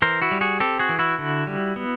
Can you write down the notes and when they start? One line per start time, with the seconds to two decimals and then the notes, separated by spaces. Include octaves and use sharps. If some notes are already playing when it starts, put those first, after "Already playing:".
0.02 E3 A#4 C5
0.22 E4 F#4
0.31 G3
0.41 F#4 G#4
0.60 C4 G4 A4
0.79 F#4 G#4
0.89 E3
0.99 E4 F#4
1.19 D3
1.47 G3
1.76 B3